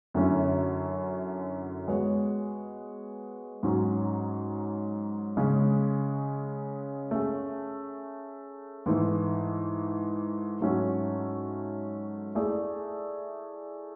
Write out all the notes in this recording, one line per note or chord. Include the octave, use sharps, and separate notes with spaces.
F#2 D3 A3 C#4 E4
G#3 B3 F#4 C#5
G#2 F#3 C#4
C#3 G#3 C#4
A3 C#4 G#4
G#2 E3 A3
G#2 F#3 A3 C#4 F#4
A3 E4 G#4 D5